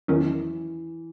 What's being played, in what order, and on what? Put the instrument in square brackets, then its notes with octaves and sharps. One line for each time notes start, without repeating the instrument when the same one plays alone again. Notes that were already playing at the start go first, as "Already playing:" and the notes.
[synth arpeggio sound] E2 D#3 F#3 C#4 [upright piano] E3